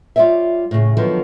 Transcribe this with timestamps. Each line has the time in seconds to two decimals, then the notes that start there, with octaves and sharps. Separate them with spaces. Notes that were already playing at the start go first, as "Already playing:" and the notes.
0.16 G3 F4 G4 C#5 D5 E5
0.71 A2 C#3
0.97 D3 D#3 F3 F#3 B3